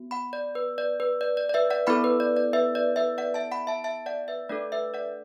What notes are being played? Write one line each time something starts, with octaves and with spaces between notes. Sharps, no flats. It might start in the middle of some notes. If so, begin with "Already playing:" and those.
Already playing: B3 F#4
F#5 B5
D5
B4
D5
B4
D5
D5
D5
B4 E5
D5 F#5
B3 E4 A4 F#5 B5
B4
D5
D5
B4 E5
D5
B4 E5
D5 F#5
E5 A5
F#5 B5
E5 A5
E5 A5
D5 F#5
B4 E5
A3 D4 A4 D5
B4 E5
D5 F#5